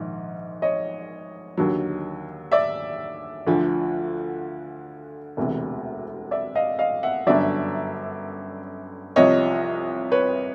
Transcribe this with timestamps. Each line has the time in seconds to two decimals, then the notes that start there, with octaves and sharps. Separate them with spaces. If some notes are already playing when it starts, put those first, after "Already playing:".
Already playing: A#1 G#2 D#3
0.62 C#5 D#5
1.57 D#2 D3 F#3
2.52 D5 E5
3.46 D2 D3 F3
5.37 E1 D2 C3 E3
6.31 D5 E5
6.55 D#5 F5
6.79 D#5 F5
7.03 E5 F#5
7.26 G1 F#2 D3 F#3 D5 E5
9.16 C2 C3 F3 C#5 D#5
10.12 B4 C#5